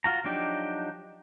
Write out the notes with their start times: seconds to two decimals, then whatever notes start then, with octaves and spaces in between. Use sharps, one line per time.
0.04 F4 F#4 A#5
0.24 F3 F#3 D4 D#4 G4